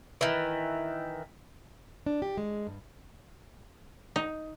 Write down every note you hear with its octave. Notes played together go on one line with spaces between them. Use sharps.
D#3 E3
D4
G4
G#3
G2
D#4